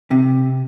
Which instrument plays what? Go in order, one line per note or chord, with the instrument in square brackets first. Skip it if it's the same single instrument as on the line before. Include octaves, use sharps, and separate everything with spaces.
[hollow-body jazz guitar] C3